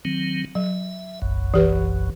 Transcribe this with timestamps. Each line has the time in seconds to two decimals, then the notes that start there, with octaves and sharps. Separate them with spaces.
0.05 D#3 F#3 C4
0.55 F#3 E5
1.22 F#1 B1 F#2
1.54 E3 G4 B4